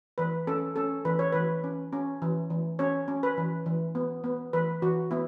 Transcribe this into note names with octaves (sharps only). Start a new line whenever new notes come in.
E3 B4
C#4 A4
C#4 A4
E3 B4
C#5
E3 B4
C#4
C#4
E3
E3
C#4 C#5
C#4
B4
E3
E3
B3
B3
E3 B4
E3 F#4
B3 E4